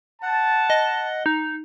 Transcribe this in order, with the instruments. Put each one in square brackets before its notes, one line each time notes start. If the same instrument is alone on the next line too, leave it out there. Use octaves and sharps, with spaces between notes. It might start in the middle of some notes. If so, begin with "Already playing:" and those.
[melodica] F#5 [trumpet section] A5
[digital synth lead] D#5
D#4